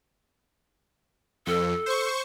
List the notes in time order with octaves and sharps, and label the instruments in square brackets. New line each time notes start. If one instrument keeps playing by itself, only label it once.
[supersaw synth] F2 [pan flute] A4
[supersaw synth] C5 C#6